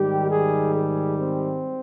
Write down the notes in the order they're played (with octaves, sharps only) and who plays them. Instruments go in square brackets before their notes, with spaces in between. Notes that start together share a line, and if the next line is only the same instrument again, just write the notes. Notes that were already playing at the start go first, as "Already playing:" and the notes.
Already playing: [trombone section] G#2 D#3 G3 G4
G#4
G#4
C4